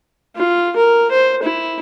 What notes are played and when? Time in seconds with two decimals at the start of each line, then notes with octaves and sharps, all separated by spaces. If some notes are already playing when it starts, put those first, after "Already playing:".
0.36 F4
0.76 A#4
1.11 C5
1.43 E4